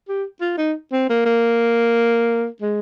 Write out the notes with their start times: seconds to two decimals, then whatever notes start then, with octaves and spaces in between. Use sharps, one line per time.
0.09 G4
0.41 F4
0.58 D#4
0.92 C4
1.10 A#3
1.25 A#3
2.62 G#3